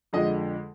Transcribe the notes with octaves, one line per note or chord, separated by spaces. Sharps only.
F2 D3 F3 G#3 D#5